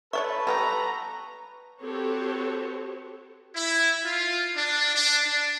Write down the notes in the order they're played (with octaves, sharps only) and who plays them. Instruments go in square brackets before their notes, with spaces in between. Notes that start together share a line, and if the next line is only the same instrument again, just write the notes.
[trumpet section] A4 B4 [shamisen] C#5 D5 E5 [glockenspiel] C#6
[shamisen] G3 B3 G4 [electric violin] A#5
[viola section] C4 F#4 G4 A4 B4 C#5
[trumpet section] E4
F4
D4
D4
D4